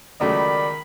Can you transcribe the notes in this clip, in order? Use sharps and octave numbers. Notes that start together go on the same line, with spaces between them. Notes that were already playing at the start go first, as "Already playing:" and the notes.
C#2 D#3 F#3 A3 D5 B5